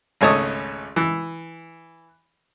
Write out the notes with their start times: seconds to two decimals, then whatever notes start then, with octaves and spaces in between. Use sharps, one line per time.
0.21 G#1 C#2 A3 C#5 A5 D#6
0.96 E3